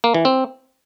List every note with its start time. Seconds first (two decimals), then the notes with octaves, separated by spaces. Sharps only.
0.04 A#3
0.14 E3
0.25 C4